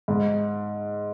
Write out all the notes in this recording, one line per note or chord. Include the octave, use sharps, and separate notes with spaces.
G#2